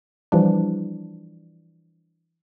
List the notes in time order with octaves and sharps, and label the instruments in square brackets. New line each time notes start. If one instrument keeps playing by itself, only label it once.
[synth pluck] E3 F3 G3 D4